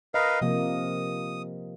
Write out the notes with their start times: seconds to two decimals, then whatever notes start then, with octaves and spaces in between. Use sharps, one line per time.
0.14 A#4 B4 D#5 F5
0.41 C3 F3 A#3 D#6